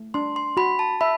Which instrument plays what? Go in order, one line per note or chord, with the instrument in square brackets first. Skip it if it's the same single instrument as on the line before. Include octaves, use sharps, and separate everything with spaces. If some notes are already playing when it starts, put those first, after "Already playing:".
Already playing: [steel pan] A3
[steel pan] D4 [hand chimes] C6
[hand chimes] C6
[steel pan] F#4 [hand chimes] B5
[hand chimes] A5
[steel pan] E5 [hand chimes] B5